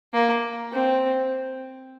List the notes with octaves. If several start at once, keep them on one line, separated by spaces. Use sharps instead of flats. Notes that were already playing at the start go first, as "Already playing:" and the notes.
A#3
C4